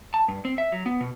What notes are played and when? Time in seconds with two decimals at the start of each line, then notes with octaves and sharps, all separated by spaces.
0.14 A5
0.28 G2
0.45 C4
0.58 E5
0.72 F#3
0.86 B3
1.01 B2